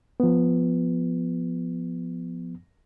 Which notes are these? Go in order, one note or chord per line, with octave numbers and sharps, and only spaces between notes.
F3 B3